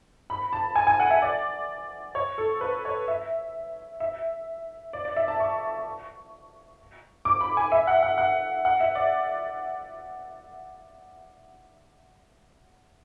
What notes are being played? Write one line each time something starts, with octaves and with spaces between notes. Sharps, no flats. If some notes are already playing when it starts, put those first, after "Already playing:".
B5
A5
G#5
G#5
F#5
E5
D5
C#5
A4
B4
C#5
E5
E5
D5
D5
E5
A5
C#6
D6
B5
G#5
E5
F#5
F#5
F#5
F#5
E5
D5